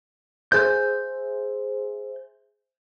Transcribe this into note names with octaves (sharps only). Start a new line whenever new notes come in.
G#4 C5 E5 G6